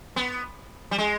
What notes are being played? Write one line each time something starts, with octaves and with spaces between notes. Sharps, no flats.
B3
G3
G#3